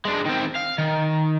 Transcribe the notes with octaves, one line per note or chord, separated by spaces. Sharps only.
G#3 D4
D#3 C4
F5
D#3